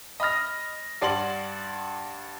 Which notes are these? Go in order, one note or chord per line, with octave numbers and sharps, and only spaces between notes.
D#5 B5 D#6 F6 A#6
G2 D5 F#5 C6 F#7